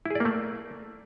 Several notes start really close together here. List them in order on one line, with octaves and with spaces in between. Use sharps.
E4 G#4 D5 A#3 A3